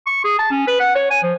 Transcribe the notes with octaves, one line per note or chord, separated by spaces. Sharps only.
C#6
G#4
A5
C#4
B4
F#5
C#5
G#5
F3